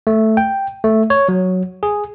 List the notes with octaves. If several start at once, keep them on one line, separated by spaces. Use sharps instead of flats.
A3
G5
A3
C#5
F#3
G#4